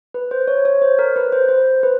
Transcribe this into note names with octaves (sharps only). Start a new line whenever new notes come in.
B4
C5
C#5
C#5
C5
A#4
B4
C5
C5
B4